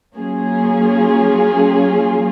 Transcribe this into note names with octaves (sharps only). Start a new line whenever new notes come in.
F#3 A#3 C#4 F4 G#4